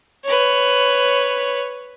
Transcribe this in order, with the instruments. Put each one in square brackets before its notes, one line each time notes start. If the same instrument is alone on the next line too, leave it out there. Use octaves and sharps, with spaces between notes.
[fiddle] B4 C#5